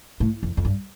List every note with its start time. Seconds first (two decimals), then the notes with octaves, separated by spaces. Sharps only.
0.20 A2
0.43 F2
0.57 F2
0.65 G2